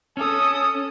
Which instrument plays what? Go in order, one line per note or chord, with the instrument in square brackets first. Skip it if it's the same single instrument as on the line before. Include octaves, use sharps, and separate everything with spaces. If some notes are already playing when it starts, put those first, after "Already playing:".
[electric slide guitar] C#4 [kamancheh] A4 D#6